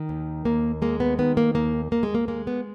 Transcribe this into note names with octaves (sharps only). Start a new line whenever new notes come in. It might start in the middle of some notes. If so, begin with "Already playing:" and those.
Already playing: D#3
D#2
D#2 A#3
G#3 A#3
B3
D#3 B3
A#3
D#2 A#3
D#2 A#3
G#3
A#3
G#3 A#3
B3